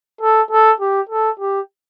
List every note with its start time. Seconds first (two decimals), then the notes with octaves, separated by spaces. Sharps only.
0.21 A4
0.51 A4
0.80 G4
1.09 A4
1.40 G4